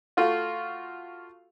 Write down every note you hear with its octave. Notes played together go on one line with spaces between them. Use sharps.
A3 F4 F#4